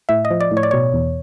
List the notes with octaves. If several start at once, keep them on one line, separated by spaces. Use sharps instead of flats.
A2 E5
D#5
F3
D5
A2
C#5
D5
B2 C#5
E2